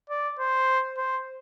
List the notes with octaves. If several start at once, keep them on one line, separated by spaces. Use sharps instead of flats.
D5
C5
C5